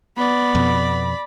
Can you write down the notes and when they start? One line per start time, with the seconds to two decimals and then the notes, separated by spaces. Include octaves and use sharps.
0.17 B3 D5 B5
0.55 F2 B2